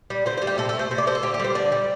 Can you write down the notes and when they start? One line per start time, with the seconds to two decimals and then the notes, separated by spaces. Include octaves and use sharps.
0.10 G3
0.26 D3 C5
0.37 G3 C5
0.47 G4
0.58 C3 A4
0.69 A4
0.75 A3 C5
0.91 C3 C5
0.98 D5
1.07 A3 C5
1.15 A4
1.23 D3 G4
1.34 G4
1.40 G3 C5
1.55 D3 D5
1.72 G3